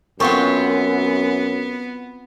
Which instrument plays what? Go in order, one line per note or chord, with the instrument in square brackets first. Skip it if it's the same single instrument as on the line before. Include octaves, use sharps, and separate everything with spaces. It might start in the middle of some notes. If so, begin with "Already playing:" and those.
[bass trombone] F#2 [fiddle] B3 [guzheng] C4 F4 F#4 [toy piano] A4 A#4 C#6